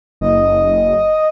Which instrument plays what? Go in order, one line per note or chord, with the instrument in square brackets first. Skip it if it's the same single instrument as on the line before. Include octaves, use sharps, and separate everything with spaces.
[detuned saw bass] F#1 [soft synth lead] D#5